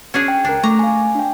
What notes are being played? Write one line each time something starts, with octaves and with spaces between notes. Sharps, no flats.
C#4 D4 G#4
G5
C#2 D4 A#4
A3 A#5 C#6 D6
F5 G#5
D4 G5